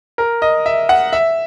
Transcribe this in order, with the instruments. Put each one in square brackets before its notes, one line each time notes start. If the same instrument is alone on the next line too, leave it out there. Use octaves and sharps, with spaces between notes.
[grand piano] A#4
D#5
E5
F#5
E5